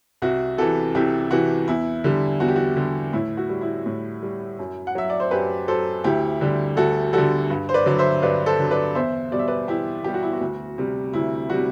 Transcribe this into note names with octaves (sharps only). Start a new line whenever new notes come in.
C2 F#4
C3 E3 F#4 A4
C2 E4 G4
C3 E3 F#4
E2 E4
D3 G3
E2 F#4
G4
F#4
D3 G3
A2 E4
F#4
G3
E4
A2
G3
F#2
F#5
F#3 E5
D5
C5
F#2 G4 B4
F#3 A4 C5
D2 E4 G4
D3 G3
D2 F#4 A4
D3 G3 F#4 A4
G2
C5
B4 D5
D3 F#3 D5
C5 E5
G2 B4 D5
A4 C5
D3 F#3
B4 D5
E2 C5 E5
B2 G3 D5
E5
B4 D5
E2 E4 G4
B2 G3 G4
F#4
E4
F#4
D2
C3 G3
D2 E4
C3 G3 F#4